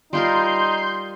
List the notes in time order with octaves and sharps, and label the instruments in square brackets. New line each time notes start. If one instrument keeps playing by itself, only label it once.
[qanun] G3 F4 A#4 [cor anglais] D#4 [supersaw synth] C6 G6